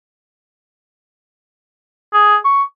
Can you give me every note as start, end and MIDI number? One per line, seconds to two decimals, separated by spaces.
2.14 2.36 68
2.45 2.63 85